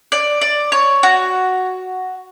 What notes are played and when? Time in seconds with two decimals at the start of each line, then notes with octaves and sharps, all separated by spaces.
0.12 D5
0.41 D5
0.72 C#5
1.03 F#4